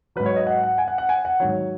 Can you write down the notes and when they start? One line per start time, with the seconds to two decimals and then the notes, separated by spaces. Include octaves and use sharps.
0.16 G#2 F#3 B4
0.26 C#5
0.36 D#5
0.47 F#5
0.63 F#5
0.78 G#5
0.88 F#5
0.98 F#5
1.09 G#5
1.25 F#5
1.40 G#2 D#3 F#3 C#5